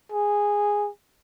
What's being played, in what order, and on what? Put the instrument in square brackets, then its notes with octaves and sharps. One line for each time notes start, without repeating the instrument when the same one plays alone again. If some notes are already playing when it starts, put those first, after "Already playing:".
[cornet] G#4